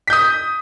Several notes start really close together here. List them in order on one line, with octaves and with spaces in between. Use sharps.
B6 G6 D#6